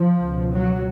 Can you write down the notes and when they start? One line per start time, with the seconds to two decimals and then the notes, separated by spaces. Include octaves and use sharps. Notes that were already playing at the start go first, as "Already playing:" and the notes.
Already playing: F3
0.21 C#2 B2
0.51 F#3